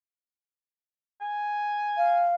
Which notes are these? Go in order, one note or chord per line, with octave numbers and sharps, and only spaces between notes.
G#5
F5